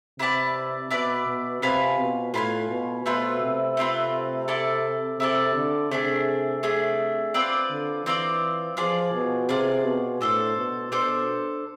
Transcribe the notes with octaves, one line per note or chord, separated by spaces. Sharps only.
C3 E4 B4 D5 A5
B2 E4 B4 D5 A5
B2
C3 F4 B4 F5 G#5
B2
A2 F4 B4 F5 G#5
B2
B2 A3 C4 F4 B4
C3
A3 C4 F4 B4
E4 A4 D5 A5
C3 E4 A4 D5 A5
D3
C3 A3 D4 G#4
A3 D4 G#4
C4 F4 B4 D5
D3
E3 C4 F4 B4 D5
F3 F4 G#4 D5
B2
C3 F4 G#4 D5
B2
A2 D4 A4 C5
B2
B2 D4 A4 C5